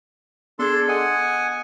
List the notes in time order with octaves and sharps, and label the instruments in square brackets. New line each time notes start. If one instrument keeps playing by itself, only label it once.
[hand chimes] B3 G#4 G#6 [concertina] D4 A4 C6
[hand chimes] D#5 D#6 [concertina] F#5 G#5